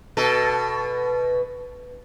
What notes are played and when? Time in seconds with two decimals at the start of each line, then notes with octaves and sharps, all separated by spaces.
0.17 B2 A4